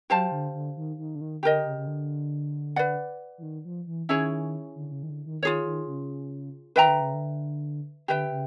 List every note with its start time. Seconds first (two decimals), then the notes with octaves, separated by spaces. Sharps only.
0.10 F#3 G4 C5 F5 A5
0.32 D3
0.54 D3
0.77 D#3
0.98 D#3
1.15 D3
1.21 D#3
1.43 D3 G4 A#4 D#5
1.66 C#3
1.77 C#3
1.87 D3
2.76 B4 D5 F#5
3.38 E3
3.43 D#3
3.65 F3
3.87 E3
4.09 D#3 C#4 E4 G#4 C#5
4.76 D3
4.89 D3
4.92 C#3
5.03 D#3
5.10 D3
5.26 D#3
5.43 D#3 F4 G#4 C#5
5.65 D#3
5.87 C#3
6.76 D#3 B4 E5 G5 A#5
6.88 D3
7.01 C#3
7.14 D3
8.08 D3 G4 B4 E5 G5
8.31 C#3